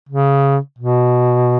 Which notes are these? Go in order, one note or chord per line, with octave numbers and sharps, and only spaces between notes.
C#3
B2